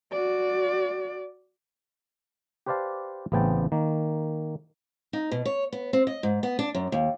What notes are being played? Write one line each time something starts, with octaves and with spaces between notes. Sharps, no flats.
F#4 D5
G4 B4 C5 D5 F5 A5
A1 C#3 B3 C4 G5 A5
D#3 A#3
D#4
B2
C#5
B3
C4
D#5
G#2
B3
D4
F#2
D#2